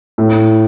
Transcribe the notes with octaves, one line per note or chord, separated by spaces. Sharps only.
A2